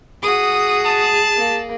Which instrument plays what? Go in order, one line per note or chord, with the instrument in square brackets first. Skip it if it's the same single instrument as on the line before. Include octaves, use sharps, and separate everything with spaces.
[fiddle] F#4 D#6 [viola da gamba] G#4
[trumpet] A5
[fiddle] A#3